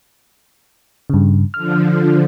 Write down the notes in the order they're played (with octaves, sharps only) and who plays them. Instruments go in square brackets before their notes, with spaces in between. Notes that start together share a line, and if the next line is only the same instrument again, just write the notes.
[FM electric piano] G2 C#3
[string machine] D3 F3 [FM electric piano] F6